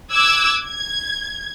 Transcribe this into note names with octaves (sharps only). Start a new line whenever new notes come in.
D6 E6 F#6 G#6
G#6